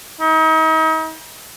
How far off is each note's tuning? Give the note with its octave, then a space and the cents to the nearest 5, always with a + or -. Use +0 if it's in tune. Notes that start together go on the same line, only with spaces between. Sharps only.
D#4 +40